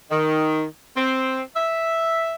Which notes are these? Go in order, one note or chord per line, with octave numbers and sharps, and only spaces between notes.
D#3
C4
E5